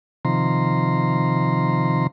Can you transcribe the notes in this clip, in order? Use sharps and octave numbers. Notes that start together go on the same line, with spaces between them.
C3 D#3 F3 A#5 C6